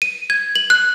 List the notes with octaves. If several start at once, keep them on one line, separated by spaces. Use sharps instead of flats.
D#7
G#6
F#7
F#6